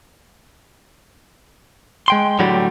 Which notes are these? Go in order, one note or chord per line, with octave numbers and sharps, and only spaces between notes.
G#3 G5 C6
A2 D3 F#3 G3